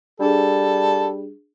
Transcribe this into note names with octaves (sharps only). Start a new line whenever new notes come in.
G3 D4 G#4 A4